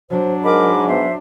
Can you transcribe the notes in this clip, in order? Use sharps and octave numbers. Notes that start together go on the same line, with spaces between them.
F#3 D4 C5
G#2 A#4 D#5 B5 D6
B3 C5 E5